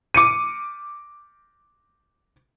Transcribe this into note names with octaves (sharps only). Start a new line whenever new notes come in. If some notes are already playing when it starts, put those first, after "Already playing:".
D6 C#7 D#7